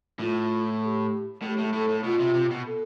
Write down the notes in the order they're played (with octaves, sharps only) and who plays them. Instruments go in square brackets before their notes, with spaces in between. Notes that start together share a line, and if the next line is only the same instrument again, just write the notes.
[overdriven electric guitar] A2 [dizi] F4
[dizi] A4
G4
[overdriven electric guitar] A2 [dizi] A4
[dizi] G4
[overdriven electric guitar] A2
[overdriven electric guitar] A2 [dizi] A4
[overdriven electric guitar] A2
[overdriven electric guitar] B2 [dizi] F4
[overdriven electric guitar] C3
C3
B2
[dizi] A4